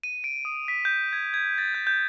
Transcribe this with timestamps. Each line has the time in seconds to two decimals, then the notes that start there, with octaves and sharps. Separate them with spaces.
0.03 D#7
0.24 D7
0.45 D#6
0.68 B6
0.85 G6
1.13 G#6
1.34 G#6
1.58 A6
1.75 G6
1.87 G6